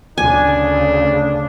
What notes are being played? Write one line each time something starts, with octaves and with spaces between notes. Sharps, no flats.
D2 C#3 D4 G#5